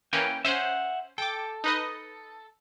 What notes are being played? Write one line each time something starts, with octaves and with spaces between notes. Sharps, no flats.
E3 A#3 C#4 G5
C#4 C5 E5 F#5
A4 G5 D6
D#4 B4 D#5